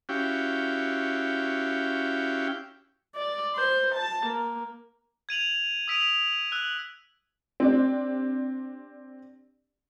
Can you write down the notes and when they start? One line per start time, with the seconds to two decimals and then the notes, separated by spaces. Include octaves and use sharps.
0.09 C#4 E4 F#4 G4 F5 G5
3.15 D5
3.55 C5
3.95 A5
4.26 A#3
5.29 G#6 D#7 F7 F#7
5.88 D#6 E6 B6 D7 D#7 F7
6.52 E6 F#6
7.60 C4 D4 G4 D5